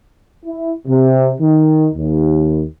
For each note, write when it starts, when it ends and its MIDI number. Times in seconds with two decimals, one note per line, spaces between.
0.46 0.72 64
0.88 1.31 48
1.41 1.87 51
1.95 2.64 39